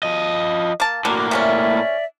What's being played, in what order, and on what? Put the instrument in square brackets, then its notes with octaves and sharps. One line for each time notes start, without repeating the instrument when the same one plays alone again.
[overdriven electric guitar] F3 D#5
[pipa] A#3 A5
[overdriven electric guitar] A2 A#3 [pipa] D3 [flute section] F#4 A#5 D6
[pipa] C3 G#3 C#4 [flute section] D5 E5